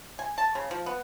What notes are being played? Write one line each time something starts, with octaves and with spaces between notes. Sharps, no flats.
G#5
A5
C#3
F3
B3